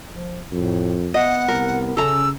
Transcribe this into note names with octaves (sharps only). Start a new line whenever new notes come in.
F3
F2 A2
B3 D#5 F#5
C2 A#4
C#3 C#4 A4 A#5 E6